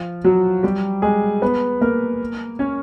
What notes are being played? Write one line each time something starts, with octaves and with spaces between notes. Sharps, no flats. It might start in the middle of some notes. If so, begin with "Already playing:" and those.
Already playing: F3 F4
F#3 F#4
G3 G4
G#3 G#4
B3 B4
A#3 A#4
C#4 C#5